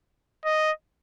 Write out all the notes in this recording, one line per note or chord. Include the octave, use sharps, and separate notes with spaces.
D#5